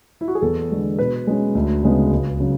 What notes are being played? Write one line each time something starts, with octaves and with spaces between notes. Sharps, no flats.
E4
F#4
G#4
E2 A4
D3 G#3 B3
B2 B4
G#3 C#4
D2
C#3 G#3 B3
C#2
C#3 F#3